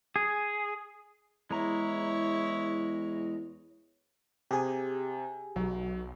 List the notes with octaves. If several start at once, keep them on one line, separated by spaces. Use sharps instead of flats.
G#4
E2 G#3 E4 C#5 A#5
C3 G4 G#4 G#5
B1 F#3